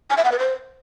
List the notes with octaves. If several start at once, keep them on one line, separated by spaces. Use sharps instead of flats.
G#5
E5
F#5
B4
C5